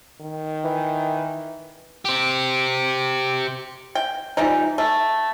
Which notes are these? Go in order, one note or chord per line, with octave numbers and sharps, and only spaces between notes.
D#3
E3
G4 C5
G5
E3 F3 G3 D#4
A3